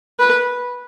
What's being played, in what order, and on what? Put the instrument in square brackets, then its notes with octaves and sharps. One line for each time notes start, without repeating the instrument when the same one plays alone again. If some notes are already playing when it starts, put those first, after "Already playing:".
[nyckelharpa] B4